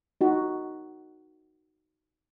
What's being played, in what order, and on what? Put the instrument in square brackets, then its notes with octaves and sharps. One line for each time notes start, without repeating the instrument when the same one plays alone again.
[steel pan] D#4 F#4